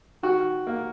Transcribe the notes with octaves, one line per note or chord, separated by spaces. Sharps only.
D#3 F#4
A#3